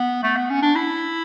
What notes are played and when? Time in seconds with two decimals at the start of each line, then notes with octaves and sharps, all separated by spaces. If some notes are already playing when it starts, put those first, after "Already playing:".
Already playing: B3
0.23 A3
0.37 B3
0.50 C#4
0.63 D4
0.76 E4